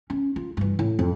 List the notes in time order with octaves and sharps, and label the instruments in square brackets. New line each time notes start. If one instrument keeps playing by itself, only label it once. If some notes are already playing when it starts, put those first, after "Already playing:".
[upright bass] C#4
F4
G2 E3
A2
F2